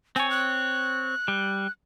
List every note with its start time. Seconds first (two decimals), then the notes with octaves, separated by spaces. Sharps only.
0.16 C4 C#5 G#5
0.31 F#6
1.28 G3